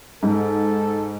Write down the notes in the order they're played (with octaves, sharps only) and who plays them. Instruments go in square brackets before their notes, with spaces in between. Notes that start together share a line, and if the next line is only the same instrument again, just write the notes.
[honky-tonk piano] G#2 [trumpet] A4